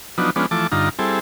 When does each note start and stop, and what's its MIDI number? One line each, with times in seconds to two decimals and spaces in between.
0.18 0.30 53
0.18 0.30 54
0.18 0.30 59
0.18 0.30 62
0.18 0.30 63
0.36 0.46 53
0.36 0.46 56
0.36 0.46 59
0.36 0.46 61
0.36 0.46 62
0.51 0.67 52
0.51 0.67 53
0.51 0.67 57
0.51 0.67 81
0.51 0.67 86
0.72 0.89 43
0.72 0.89 50
0.72 0.89 63
0.72 0.89 65
0.72 0.89 82
0.99 1.19 55
0.99 1.19 60
0.99 1.19 64
0.99 1.19 68
0.99 1.19 69